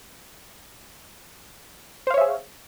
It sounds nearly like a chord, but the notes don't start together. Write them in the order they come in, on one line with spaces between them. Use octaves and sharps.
C5 F5 C#5 E5 G#4